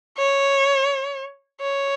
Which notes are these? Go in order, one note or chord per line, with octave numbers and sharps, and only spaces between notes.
C#5
C#5